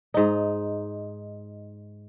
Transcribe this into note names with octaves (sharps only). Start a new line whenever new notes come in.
G#2 D#4